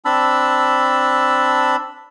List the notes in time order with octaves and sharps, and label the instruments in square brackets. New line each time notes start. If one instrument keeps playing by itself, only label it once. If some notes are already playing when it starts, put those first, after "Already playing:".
[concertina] C4 D4 A5 B5 E6